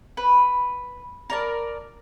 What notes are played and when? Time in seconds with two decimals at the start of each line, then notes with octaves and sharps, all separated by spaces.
0.17 B4
1.30 A#4 D5 A5